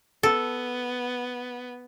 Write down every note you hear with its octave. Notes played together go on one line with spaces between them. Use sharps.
B3 A4